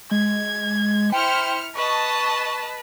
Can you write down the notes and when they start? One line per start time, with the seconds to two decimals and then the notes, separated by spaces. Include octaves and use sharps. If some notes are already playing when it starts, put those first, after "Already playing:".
0.11 G#3 G#6
1.12 E4 C5 G5 F6 C#7
1.75 B4 D#5 A5 C#6